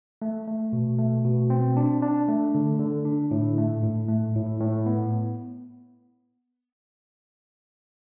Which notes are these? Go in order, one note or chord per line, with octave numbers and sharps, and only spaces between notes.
A3
A3
B2
A3
B2
C4
D4
D4
A3
D3
D3
D4
A2
A3
A2
A3
A2
A2
B3